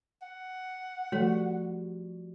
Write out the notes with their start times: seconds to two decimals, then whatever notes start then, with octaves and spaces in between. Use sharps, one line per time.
0.22 F#5
1.12 F3 G3 A3 F#4 A4 C#5